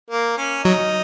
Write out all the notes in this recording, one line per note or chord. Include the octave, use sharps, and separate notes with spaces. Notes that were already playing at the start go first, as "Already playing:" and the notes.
A#3
C#4
F#3 D#4